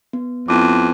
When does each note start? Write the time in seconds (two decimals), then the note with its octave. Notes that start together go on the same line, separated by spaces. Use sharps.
0.13 B3
0.48 F2 B3 E4 D6